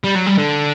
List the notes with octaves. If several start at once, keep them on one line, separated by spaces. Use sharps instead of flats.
G3
F#3
G3
D3